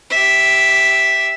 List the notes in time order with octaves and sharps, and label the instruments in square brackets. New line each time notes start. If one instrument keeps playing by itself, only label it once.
[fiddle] G4 E5